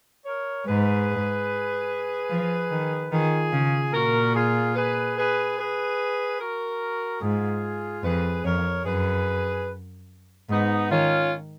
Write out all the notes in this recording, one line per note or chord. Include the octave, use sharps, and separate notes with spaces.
A#4 C#5
G#2 G#4 B4
F3
D#3
D#3 F4 G#4
C#3
A#2 F#4 A#4
F4 G#4
G#4 B4
G#4 B4
G#4 B4
F#4 A#4
G#2 F4 G#4
F2 G#4 B4
F2 A#4 C#5
F#2 G#4 B4
G#2 B3 D#4
D#3 C#4 F4